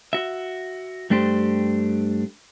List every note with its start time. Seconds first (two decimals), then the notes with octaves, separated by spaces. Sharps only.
0.13 F#4 E5
1.10 G2 A3 D4 G4 C5